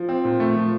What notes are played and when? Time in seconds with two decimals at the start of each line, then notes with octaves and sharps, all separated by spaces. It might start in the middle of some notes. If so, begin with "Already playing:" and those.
Already playing: F3
0.09 C4
0.25 A#2
0.40 A3
0.56 F3